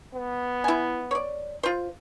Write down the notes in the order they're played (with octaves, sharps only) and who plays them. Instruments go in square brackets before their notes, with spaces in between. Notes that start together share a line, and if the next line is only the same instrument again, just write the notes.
[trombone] B3
[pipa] E4 G#5
C#5 D5
F4 C5